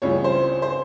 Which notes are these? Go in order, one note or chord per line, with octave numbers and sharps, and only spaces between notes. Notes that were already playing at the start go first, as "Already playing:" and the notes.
C#2 C#3 E3 G3 C#5
C5
C5